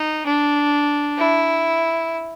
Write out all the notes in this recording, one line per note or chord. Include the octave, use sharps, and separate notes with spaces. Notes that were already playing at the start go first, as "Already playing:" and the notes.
Already playing: D#4
D4
E4